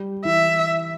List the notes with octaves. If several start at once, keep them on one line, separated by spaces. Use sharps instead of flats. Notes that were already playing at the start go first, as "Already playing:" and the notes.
Already playing: G3
E3 E5